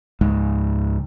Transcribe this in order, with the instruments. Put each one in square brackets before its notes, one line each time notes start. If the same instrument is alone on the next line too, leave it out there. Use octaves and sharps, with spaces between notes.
[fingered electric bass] C#2 G#2